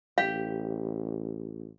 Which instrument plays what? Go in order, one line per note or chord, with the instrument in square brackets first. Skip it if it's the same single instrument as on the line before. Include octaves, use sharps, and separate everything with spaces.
[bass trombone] A1 [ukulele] G4 [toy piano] F5